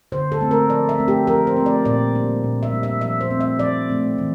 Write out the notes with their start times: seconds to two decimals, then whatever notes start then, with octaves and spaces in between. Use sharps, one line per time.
0.12 D3 C5
0.32 A4
0.41 A3 C4
0.51 A#4
0.69 F3 D5
0.89 E5
0.98 A3 C4
1.08 G4
1.27 F3 A#4
1.47 C5
1.56 A3 C4
1.66 D5
1.85 A#2 D5
2.15 G3 D4
2.44 A#2
2.63 E5
2.72 G3 D4
2.83 E5
3.01 F3 E5
3.21 C5
3.30 A3 C4
3.41 E5
3.59 F3 D5
3.89 A3 C4
4.18 E3